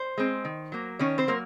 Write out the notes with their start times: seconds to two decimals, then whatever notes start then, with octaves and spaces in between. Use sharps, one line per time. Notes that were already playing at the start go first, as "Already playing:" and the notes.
Already playing: C5
0.18 G#3 C4
0.45 D#3
0.72 F#3 A#3
0.99 D#3 C#4 C#5
1.18 C4 C5
1.27 F#3 A#3 A#4